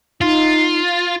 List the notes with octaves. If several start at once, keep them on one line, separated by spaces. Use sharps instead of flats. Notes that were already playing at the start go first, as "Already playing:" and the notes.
D#4 F4